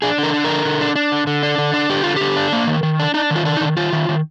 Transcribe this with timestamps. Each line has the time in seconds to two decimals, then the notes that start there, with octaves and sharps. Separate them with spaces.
0.02 D4 G#4
0.18 D3 A#4
0.34 D4
0.44 A#4
0.50 D3
0.65 D3
0.81 D4
0.96 D4
1.12 D3
1.27 D3
1.43 D4
1.58 D3
1.74 D4
1.90 D3 G4
2.03 D3 F4
2.16 D3 G4
2.36 D4
2.53 A#3
2.67 D#3
2.83 D#3
3.00 D4
3.14 D4 D#4
3.31 D#3
3.36 F4
3.45 D4
3.57 D#4
3.61 D#3
3.77 D#3 F4
3.93 D#3
4.09 D#3